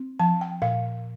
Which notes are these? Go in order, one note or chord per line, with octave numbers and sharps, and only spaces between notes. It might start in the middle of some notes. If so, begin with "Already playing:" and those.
Already playing: C4
F3 A5
G5
A#2 F5